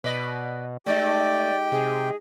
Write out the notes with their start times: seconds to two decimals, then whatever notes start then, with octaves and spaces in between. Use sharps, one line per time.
0.04 B2 B4 D5 D#5
0.86 G#3 A3 D#4 G4 D5 D#5 G5
1.72 C3 G#4